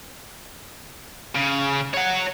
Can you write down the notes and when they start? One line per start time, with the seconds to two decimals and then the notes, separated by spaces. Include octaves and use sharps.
1.35 C#3
1.94 C#5 F#5